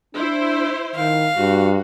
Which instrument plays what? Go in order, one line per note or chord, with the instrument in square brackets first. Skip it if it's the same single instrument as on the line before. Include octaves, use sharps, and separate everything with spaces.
[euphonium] D4 [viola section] E4 C5
[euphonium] D#3 [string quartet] F5
[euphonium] G2 [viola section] F#4